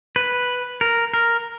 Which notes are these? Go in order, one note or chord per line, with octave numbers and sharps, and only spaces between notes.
B4
A#4
A#4